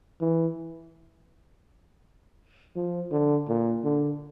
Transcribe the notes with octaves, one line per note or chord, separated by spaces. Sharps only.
E3
F3
D3
A#2
D3